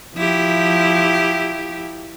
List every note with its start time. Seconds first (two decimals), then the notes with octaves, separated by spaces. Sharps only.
0.16 F3 E4 G4